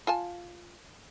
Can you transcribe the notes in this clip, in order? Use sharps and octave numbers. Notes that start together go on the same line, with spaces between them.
F4 G#5 A5